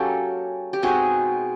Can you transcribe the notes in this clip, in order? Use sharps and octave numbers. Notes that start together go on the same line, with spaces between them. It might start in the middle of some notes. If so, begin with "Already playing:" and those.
Already playing: F#3 A#3 C#4 G4 A4
G4
B2 G#3 C4 D#4 F#4 G#4